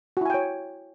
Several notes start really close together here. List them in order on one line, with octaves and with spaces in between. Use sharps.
F#4 E4 G#5 G5 C#5